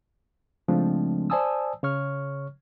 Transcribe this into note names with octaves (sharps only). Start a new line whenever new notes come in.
C#3 F3 G#3 A3 C4 D4
C5 D5 G#5 A5 D#6 E6
C#3 C#5 C#6 F6